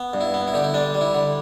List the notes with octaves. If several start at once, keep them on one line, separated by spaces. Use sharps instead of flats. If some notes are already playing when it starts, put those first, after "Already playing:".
Already playing: B3
G2
E4
B3
E4
D3 G4
E4
G3 D4
G3
E4
D3